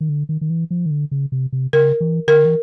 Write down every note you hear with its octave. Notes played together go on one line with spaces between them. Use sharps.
D#3
D3
D#3
D#3
E3
F3
D#3
D3
C#3
C3
C3
C#3 A#4
E3
D3 A#4
E3